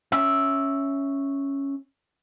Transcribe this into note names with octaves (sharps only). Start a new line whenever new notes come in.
C#4 E5